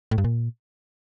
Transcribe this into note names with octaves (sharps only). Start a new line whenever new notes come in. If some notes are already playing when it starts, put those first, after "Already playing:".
A2
G2
A#2